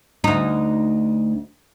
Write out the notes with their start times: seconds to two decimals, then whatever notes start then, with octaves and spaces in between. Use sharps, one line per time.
0.24 D2 D#4